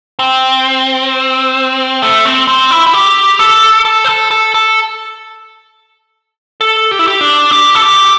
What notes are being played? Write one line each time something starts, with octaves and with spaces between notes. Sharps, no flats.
C4
A3
C4
C4
E4
E4
G4
A4
A4
C5
A4
A4
A4
A4
G4
E4
G4
D4
G4
A4
G4